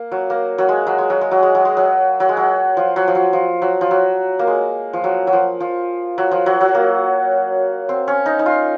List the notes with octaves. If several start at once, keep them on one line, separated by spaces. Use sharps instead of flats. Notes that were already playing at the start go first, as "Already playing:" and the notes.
Already playing: A#3
F#3
A#3
F#3
G#3
F#3
G#3
F#3
G#3
F#3
G#3
F#3
G#3
F#3
F#3
G#3
F#3
F3
F#3
F3
F#3
F3
F#3
F3
F#3
A#3
G#3
F3
F#3
F#3
F3
F3
F#3
F3
F#3
F#3
A#3
C4
C#4
D#4
D#4
F4